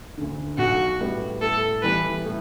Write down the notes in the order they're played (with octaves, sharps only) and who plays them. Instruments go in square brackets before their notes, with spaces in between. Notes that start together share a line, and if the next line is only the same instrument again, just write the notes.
[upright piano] D2 D3
[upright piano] B1 [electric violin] F#4
[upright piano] A2 G3 B3
[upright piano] A2 [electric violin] A4
[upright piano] E3 G3 B3 E4 [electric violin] B4
[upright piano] A2